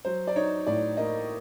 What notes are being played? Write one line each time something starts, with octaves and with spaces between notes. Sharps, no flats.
F#3 C5
D5
D#4 C#5
A2 D5
A#3 D#5